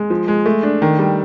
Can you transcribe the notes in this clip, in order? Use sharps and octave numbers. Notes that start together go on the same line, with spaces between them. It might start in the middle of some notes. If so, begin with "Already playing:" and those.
Already playing: G#3
F3
G#3
A3
D4
D#3
G3